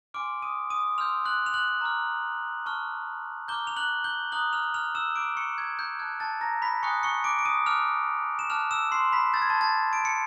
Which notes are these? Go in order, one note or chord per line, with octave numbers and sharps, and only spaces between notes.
G#5 C6 D6 F6 D7
D#6 D#7
D#6 D#7
C6 E6 F6 G6 F7
F#6 F#7
F7
F#6 F#7
A#5 D6 F6
A5 C#6 F6
A#5 D6 F6 G6 G7
F7
F#6 F#7
G6 G7
A#5 D#6 F#6 F#7
F6 F7
F6 F7
E6 E7
B5 D6 E6 G6 D7
C#6 C#7
G#6
G6
A5 C#6 F#6 G#6
A5 A6
A#5 A#6
B5 B6
G#5 B5 C#6 D#6 F#6 C#7
C#6 C#7
D6 D7
D7
D#6 D#7
A5 D6 F6 F#6 F7
E7
A5 D6 F6 F#6 F7
E6 E7
C6 C7
B5 B6
C6 E6 G6 A6
G#6
A5 A6
A5 A6
D7
C#7